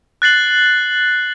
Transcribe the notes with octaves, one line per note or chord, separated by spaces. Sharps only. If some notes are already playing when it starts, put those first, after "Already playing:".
F#6 A6 C7 F#7